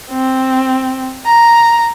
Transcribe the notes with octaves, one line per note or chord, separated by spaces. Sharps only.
C4
A#5